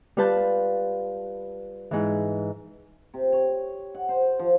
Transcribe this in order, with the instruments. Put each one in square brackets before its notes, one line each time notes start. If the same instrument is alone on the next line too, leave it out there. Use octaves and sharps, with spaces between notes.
[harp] G3 F4 B4 A5 G6
G#2 E3
[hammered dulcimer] C3
C#5
F#5
C5
F3